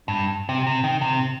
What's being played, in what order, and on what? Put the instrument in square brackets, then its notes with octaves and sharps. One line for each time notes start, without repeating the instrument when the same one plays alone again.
[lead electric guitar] G2
C3
C3
D#3
C3